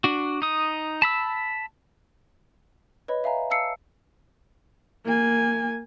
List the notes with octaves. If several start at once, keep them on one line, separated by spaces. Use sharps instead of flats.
D4 F#4
D#4 D#6
A5 B5 E6
B4 C#5 D#5 B5
E5 F5 G#5 A#5
F5 A5 E6 C7 C#7
A#3 G#5